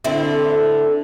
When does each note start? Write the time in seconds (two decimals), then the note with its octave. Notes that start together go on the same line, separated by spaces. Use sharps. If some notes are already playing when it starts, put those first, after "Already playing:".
0.04 D3 C4 E4